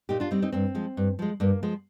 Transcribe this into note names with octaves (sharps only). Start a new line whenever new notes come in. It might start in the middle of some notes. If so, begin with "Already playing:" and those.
A#2 D#4 G4
D4 F4
G3 C4 D#4
C4 D#4
G2 C4
F3 G#3
G2
F3 G#3
G2 A#3
F3 G#3